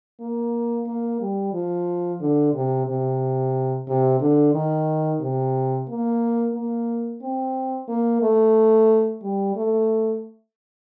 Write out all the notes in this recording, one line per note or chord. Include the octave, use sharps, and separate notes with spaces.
A#3
A#3
G3
F3
D3
C3
C3
C3
D3
D#3
C3
A#3
A#3
C4
A#3
A3
G3
A3